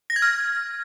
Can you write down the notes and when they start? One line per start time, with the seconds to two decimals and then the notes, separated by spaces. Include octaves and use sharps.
0.10 A#6
0.16 G#6
0.22 F6